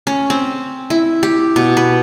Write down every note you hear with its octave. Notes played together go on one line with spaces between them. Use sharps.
C#4
C4
E4
G4
B2
B4